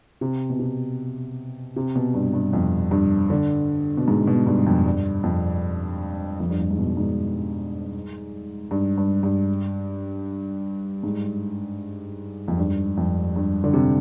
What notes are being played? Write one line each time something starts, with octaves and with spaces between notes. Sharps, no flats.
C3
B2
C3
C3
B2
G2
G2
F2
G2
D3
B2
G#2
B2
G2
F2
G2
F2
F2
G2
F2
G#2
B2
G#2
G2
G2
G2
G#2
F2
G2
F2
G2
D3
C3